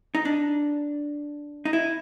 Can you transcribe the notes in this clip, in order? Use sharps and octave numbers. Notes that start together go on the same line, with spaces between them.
D#4
D4
D#4
E4